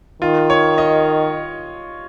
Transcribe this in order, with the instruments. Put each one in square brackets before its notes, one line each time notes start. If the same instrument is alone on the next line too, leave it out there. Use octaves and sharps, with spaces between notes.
[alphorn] D#3 [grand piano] F4
[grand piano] C#5
D#5